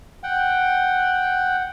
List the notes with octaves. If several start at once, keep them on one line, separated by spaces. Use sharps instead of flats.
F#5 G5